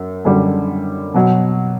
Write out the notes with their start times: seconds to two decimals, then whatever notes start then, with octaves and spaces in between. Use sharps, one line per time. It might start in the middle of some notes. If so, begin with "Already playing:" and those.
Already playing: F#2
0.25 F#2 D3 G3
1.14 B2 F#3